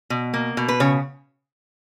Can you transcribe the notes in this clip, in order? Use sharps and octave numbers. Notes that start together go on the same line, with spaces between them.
B2
A#3
B2
B4
C#3 C#5